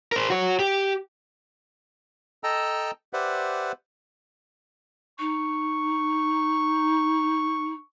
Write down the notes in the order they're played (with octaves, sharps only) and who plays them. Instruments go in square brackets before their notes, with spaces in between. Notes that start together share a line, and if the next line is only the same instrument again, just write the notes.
[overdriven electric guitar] A#4 C5
F#4 C#5
G4
[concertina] A4 D#5 G5 A5 A#5 E6
G4 B4 C5 D5 E5 F#5
[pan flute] D#4 [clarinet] C#6